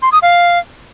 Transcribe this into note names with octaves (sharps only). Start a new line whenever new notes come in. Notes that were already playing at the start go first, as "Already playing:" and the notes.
C6
D#6
F5